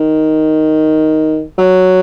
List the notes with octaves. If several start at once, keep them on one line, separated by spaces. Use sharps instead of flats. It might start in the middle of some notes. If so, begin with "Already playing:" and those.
Already playing: D#3
F#3